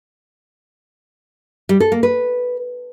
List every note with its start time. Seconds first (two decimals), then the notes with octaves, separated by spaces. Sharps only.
1.69 G3
1.80 A4
1.92 A#3
2.03 B4